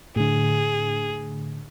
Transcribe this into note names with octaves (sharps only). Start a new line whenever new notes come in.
A2 D3 G#4